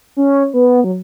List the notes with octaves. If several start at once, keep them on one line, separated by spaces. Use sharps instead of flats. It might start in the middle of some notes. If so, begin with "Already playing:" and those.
C#4
B3
F#3